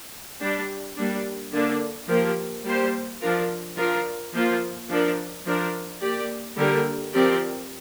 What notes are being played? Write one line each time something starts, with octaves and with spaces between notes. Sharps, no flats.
G3 D4 G4
G3 A#3 D4
D3 A#3 D4
F3 A#3 G4 A#4
G3 A#3 G4 C5
F3 D4 F4 A#4
F3 D4 F4 A#4
F3 A#3 F4 C5
F3 D4 A#4
F3 D4 A#4
A#3 G4 D5
D3 G3 A#3 G4 A#4
F3 C4 G4 A#4 D5